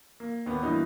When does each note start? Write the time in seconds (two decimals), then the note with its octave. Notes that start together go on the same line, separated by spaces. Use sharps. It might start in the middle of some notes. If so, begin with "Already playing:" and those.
0.20 A#3
0.46 D#2 B3
0.63 G2 E3 A#3 B3 D#4 F#4